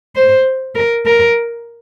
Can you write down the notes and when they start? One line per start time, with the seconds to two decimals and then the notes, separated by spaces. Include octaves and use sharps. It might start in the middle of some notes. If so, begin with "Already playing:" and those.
0.16 C5
0.75 A#4
1.06 A#4